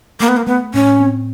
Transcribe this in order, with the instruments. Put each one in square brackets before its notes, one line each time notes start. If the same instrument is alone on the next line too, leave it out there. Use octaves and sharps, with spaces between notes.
[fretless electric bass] A3 [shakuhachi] A#3
[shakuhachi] B3
A#3
[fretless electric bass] A3 [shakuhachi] B3
[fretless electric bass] A2 [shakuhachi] C#4
[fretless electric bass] C4